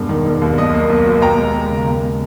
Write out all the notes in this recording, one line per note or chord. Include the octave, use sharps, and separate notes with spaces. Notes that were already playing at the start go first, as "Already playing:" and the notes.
Already playing: E1 G2
D#3
E1
D#2
B1 D#5
A#3
B1
B2
D#2 G5 A#5
G#3
D#2
C#3
D#2
G#3